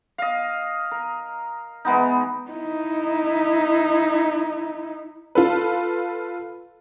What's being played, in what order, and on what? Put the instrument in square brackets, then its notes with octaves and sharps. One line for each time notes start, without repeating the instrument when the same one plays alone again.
[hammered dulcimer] D#5 F5
A#4
E3 G#3 B3 D#4
[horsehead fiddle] D#4 E4
[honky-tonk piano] F4 A4 B4